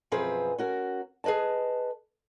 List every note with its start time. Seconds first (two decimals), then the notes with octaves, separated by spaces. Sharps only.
0.12 F#2 B2 F3 C4 G#4 B4
0.58 C#4 F#4 A#4
1.24 G#4 B4 D5 D#5 A5